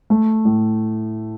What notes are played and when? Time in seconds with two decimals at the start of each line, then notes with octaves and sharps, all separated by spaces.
0.10 A3
0.45 A2